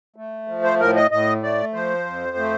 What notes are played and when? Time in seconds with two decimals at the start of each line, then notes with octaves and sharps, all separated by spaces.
0.16 A3
0.48 F3
0.64 C5
0.80 A2 A#4
0.96 D#5
1.11 A2 D#5
1.42 A3 D5
1.74 F3 C5
2.06 F2
2.37 A3